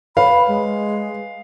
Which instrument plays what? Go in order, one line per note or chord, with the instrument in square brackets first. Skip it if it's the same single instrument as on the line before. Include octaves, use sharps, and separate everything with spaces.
[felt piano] B4 C#5 [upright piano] F5 [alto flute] B5
[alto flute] G#3